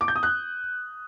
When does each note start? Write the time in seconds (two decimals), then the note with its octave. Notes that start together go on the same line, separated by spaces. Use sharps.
0.01 D6
0.08 G6
0.16 D#6
0.23 F#6